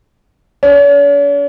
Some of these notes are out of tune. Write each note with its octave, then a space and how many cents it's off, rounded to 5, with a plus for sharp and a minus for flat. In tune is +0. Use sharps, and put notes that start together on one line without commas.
C#4 +45